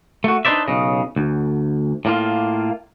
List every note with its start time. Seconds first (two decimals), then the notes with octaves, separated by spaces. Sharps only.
0.24 A3 F#4
0.45 D4 D#4 B4 C5 D5 E5
0.68 B1 C#3 D#5
1.16 D2
2.05 A2 A#3 F4